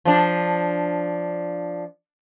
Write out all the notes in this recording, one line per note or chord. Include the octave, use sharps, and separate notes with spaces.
F3 D4